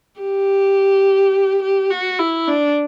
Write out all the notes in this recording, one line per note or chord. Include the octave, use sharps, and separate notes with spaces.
G4
G4
F#4
E4
D4